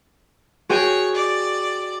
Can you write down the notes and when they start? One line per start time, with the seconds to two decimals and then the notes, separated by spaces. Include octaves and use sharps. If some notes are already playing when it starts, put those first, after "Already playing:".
0.69 F#4 G#4 C#5 G5
1.15 D5